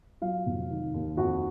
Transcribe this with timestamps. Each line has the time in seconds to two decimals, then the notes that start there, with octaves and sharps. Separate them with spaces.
0.22 F#3 F4 F5
0.46 F1
0.70 D#3
0.94 D#2
1.17 F2 F#4 F#5